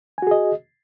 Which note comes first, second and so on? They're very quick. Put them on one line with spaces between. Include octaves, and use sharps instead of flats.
G#5 F#4 G#4 D#5